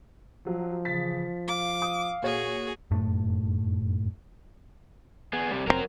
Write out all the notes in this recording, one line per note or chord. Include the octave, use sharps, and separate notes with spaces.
F3 F#3
C#3 E3 A6 B6
F5 D6
D#6
A#2 F#4 G#4 C#5
F1 F#2 A2 A3
B3 G#4
C3 G3
F1 C3 F#3 C4 A#4 A#5